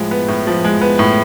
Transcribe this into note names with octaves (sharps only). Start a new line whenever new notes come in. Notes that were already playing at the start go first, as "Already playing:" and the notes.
Already playing: A2 F3 G#3
B3
A2
F3
G#3
B3
A2